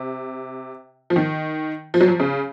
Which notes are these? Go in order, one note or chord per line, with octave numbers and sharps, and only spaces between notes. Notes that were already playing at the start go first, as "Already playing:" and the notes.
Already playing: C3
F3
D#3
F3
F#3
F3
C#3